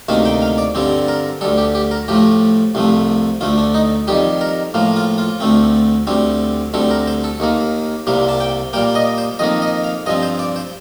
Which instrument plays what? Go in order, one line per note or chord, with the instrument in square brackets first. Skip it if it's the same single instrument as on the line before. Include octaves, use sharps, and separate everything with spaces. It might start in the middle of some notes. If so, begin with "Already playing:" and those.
[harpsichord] D2 C3 D#3 A#3 A5
G5
F5
D5
G2 D3 G3 C4
A#4
D2 D3 G3 A4
G4
G4
A#4
A2 F3 A3 G4
C2 C3 F3 A3
D2 D3 A3 F4
D4
D#4
F2 D#3 G3 G4
A#4
A2 F3 A#3
F4
F4
D2 D3 A3 C4
D2 D3 G3 C4
D2 D3 G3 C4 A4
A#4
C5
A4
D#2 D#3 A#3
C2 C3 G3 A#3
A5
G5
A#2 G3 A#3 G5
D#5
C5
F2 D#3 A#3 D#5
D#5
F5
G2 F3 C4 D#5
C5
D5
C5